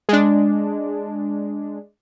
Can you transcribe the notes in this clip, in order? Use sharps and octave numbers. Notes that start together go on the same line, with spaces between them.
G#3 D4